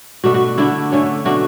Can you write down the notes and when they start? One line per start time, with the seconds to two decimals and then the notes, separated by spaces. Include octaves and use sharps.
0.24 B2 A3 D4 F#4
0.34 F#4
0.58 D3 A3 D4 E4
0.92 D3 A3 C#4
1.25 B2 A3 D4 F#4